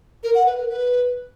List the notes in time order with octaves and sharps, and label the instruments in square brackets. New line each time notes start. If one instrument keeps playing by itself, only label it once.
[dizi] A#4
F#5
B4
A#4
B4